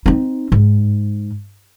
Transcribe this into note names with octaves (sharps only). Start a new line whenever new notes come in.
C4 D#4
G#2